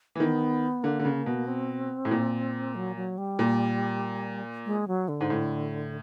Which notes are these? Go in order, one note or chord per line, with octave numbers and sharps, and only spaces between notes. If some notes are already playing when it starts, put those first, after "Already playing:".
E3
D#3 B3
D3 A#3
D3
C#3
B2
C4
A2
A#2
F#3
F#3
G3
A#2
G#3
F#3
D3
G#2
A2